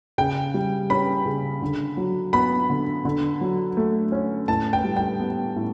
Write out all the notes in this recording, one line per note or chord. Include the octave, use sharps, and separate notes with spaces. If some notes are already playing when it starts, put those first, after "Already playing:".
C#3 G5
G3
C#4 B5
C#3
D3
F#3
B3 B5
D3
D3
F#3
A3
C#4
A2 A5
G5
G3
G5
B3
A2